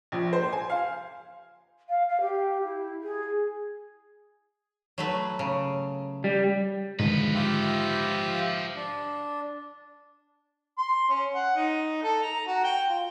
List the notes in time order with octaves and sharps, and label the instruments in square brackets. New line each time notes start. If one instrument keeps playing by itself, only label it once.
[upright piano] A#1
C5
G#5
F5
[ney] F5
F5
G4
E4
G#4
[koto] F#3 A3 B4
C#3
[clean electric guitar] G3
[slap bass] G#2 D3 D#3 [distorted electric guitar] F3 B4
[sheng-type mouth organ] F4 G4 E5
D4
[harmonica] C6
C#4
F#5
D#4
A4
A#5
F#4
G5
F4